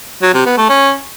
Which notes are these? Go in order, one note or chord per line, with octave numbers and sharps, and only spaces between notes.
F#3
C3
B3
A3
C#4